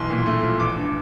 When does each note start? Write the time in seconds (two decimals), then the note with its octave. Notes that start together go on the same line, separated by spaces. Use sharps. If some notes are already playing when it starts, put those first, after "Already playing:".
Already playing: B1 E3 C6
0.10 A#2
0.26 A3
0.44 F3
0.60 A1 D6
0.76 G2